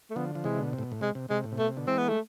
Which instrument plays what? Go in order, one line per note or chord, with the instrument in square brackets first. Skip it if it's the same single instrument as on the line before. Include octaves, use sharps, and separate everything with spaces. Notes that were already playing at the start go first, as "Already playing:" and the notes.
[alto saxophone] A3
[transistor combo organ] D3 F3 [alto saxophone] B3
[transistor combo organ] F3
[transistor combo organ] C3 E3 [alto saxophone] G#3
[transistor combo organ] B2 D3
C3
A2
B2
A2
[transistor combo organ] C3 [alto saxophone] G#3
[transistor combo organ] C3
[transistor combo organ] C3 [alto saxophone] G#3
[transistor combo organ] A2
C3
[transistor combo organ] B2 [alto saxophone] A3
[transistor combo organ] C3
B2 D3
[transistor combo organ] E3 G#3 [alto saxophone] C4
[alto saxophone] B3
A3